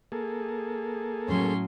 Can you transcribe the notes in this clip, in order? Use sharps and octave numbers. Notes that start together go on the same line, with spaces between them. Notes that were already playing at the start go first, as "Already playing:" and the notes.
A#3 G#4 A4
A2 F#3 C#4 C6